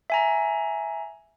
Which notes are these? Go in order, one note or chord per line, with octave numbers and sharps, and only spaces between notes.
E5 G#5 A#5